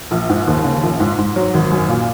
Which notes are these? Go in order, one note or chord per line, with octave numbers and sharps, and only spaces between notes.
A#1
G#2
D#2
C#3
A#1
G#2
G#2
F#3
G#1
F#2
A#2